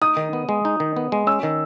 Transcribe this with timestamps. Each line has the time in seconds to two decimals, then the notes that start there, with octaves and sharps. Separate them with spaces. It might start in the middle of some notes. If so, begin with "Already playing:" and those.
0.01 D#4 D#6
0.17 D#3
0.33 B3
0.49 G#3
0.65 D#4
0.80 D#3
0.96 B3
1.12 G#3
1.27 C#4 E6
1.43 D#3